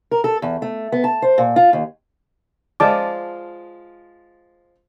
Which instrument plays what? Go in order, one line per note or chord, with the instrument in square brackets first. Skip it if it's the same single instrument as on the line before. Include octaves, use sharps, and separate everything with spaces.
[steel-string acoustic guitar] A#4
A4
E2
A3
B3
A5
C5
A#2
F4
D#2
[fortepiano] F3 G#3 F4 [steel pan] D5 A5 D6